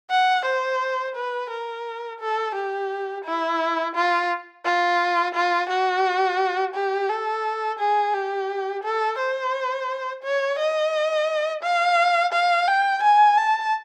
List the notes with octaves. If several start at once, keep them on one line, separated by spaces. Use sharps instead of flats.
F#5
C5
B4
A#4
A4
G4
E4
F4
F4
F4
F#4
G4
A4
G#4
G4
A4
C5
C#5
D#5
F5
F5
G5
G#5
A5